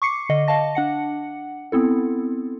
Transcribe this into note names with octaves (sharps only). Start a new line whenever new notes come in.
C#6 D6 C7 C#7
D3 D#5
D#5 F5 A5 A#6
D4 F#5 C#7
B3 C4 E4 A4